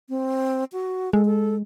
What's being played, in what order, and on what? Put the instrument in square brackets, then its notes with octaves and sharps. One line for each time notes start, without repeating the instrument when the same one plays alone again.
[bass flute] C4
F#4
[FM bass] G#3 [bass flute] A4
[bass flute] A4